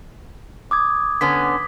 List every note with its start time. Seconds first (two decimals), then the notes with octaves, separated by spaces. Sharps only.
0.71 D6 D#6 G#6
1.21 D3 B3 C#4 B6